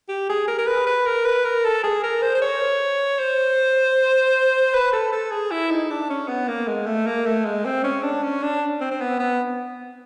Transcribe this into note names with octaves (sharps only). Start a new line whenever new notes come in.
G4
G#4
A#4
A#4
B4
B4
A#4
B4
A#4
A4
G#4
A#4
C5
C5
C#5
C5
B4
A4
A4
G#4
E4
D#4
D4
C#4
B3
A#3
G#3
A3
A#3
A3
G#3
C4
C#4
D4
C#4
D4
C4
C4
B3
B3